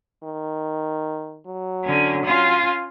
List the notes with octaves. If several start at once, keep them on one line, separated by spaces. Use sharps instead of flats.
D#3
F#3
D3 C#4
C#4 F4